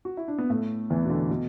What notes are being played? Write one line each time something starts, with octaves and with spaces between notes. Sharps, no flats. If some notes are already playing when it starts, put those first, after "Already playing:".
F#4
E4
D4
B3
A2 A3
E2 E3
B2
D3
B2